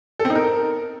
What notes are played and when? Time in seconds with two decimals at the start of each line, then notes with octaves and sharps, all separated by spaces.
0.19 A4
0.25 C4
0.30 D#4
0.35 A#4